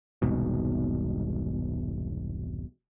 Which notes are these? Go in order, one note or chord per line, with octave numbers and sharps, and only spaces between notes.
E1 C2 G#2 B2